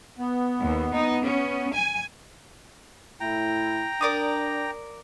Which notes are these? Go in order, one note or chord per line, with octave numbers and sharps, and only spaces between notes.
B3
D#2
D#4
C#4
G#5
A2 E4 G5 A#5
D4 A#4 D5 D#6